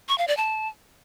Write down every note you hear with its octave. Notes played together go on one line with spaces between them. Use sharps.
C#6
F5
D5
A5